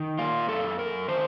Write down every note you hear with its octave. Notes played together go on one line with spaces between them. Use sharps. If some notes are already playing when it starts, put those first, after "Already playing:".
Already playing: D#3
A#3 F4
F#2 A4
F#2 A#4
D#3 C5